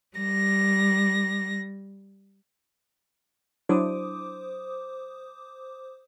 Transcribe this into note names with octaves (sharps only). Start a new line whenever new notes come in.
G3 A#6
F#3 D4 E4 C5 D6 D#6